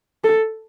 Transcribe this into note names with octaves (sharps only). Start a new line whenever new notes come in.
A4